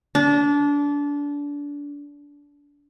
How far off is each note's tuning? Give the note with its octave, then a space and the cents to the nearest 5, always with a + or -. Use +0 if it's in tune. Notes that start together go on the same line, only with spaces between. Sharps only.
D4 -25